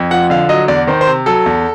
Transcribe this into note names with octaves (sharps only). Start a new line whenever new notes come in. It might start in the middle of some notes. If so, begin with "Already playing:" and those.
Already playing: F2
F3 F#5
D3 F5
F#3 D#5
E2 D5
D#3 C5
C5
C3
F#3 A4
E2